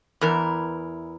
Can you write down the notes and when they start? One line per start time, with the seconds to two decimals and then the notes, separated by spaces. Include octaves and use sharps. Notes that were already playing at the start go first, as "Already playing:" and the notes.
0.21 E2 E3 A#4